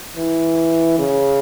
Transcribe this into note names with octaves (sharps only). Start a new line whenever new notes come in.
E3
C#3